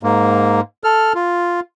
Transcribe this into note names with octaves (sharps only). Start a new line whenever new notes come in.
G#2 A#3
A4 F6
F4